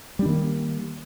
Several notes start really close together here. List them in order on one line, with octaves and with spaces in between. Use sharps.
G3 D4 D#3 A#3